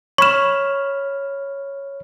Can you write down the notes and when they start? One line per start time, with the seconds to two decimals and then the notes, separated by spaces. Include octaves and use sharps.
0.18 C#5 B5 C#6 F6 E7